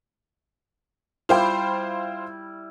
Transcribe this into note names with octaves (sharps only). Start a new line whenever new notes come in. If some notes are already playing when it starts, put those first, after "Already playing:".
G3 E4 F4 C5 G5